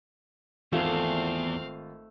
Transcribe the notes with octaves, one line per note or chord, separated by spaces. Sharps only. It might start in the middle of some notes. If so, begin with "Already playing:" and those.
G#1 E2 A3 C4 F4 F5